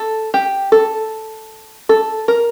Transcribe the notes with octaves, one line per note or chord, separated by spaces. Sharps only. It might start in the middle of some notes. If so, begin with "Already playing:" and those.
Already playing: A4
G4
A4
A4
A#4